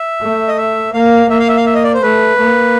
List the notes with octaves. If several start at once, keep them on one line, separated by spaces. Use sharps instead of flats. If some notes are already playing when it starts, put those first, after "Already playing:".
Already playing: E5
A3
D#5
E5
A#3 F5
A#3 E5
F5
E5
F5
E5
D#5
D5
C5
A3 B4
A#3